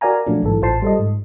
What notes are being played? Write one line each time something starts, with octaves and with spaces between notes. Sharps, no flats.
F#4 A#4 D5 F5 G#5 A#5
A#2 F3 F#3 A3 C#4 D4
A#1 G#2 E3 A4
A1 F4 C5 A5 C7
G3 A4 D#5
G#2